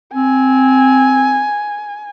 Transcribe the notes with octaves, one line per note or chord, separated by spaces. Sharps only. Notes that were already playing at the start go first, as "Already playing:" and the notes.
C4 G#5